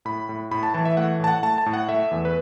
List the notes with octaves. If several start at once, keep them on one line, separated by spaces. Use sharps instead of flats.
A2 B5
A2
A2 B5
A5
E3 A5
E5
A3 F#5
A2 A5
F#5
A3 A5
A5
A2
F#5
A3 E5
E2
B4